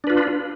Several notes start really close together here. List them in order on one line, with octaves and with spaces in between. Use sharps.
D4 B4 F4